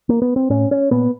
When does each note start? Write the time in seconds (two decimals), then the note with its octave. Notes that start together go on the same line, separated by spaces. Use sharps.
0.09 A#3
0.22 B3
0.36 C4
0.50 A2 C#4
0.71 C#4
0.91 A#2 B3